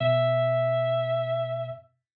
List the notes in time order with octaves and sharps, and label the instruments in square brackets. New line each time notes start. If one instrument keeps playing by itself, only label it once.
[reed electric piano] B2 [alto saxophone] E5